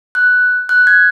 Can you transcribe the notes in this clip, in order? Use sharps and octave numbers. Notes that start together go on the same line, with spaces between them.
F#6
F#6
G#6